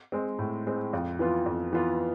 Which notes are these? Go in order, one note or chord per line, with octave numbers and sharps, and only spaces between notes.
G#3 C4
A2
G#3 C4
F2
E3 B3 F4
F2
E3 B3 F4